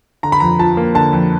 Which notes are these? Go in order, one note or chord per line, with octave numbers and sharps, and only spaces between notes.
D3 A#5
B5
F2 A#5
F3 A5
A#3
D3 A5
F2